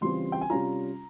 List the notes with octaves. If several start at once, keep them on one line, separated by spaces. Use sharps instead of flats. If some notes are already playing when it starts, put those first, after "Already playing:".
C#3 E3 G3 C4 F4 C6
G5
G#5
C3 G3 C#4 F4 A#5